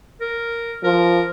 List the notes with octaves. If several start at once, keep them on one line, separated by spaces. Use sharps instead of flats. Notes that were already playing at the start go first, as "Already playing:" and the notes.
A#4
F3 A#4